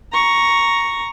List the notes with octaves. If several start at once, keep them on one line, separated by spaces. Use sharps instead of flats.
A#5 C#6